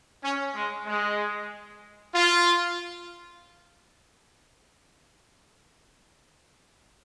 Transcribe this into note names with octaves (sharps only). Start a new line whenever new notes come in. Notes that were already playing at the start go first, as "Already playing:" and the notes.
C#4
G#3
G#3
F4